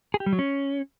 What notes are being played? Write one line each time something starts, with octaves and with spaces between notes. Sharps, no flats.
G#4
G4
G3
F#3
C#4